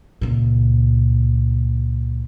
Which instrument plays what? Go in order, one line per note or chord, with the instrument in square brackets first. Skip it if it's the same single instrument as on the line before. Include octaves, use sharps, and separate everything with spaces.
[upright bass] C#2 A#2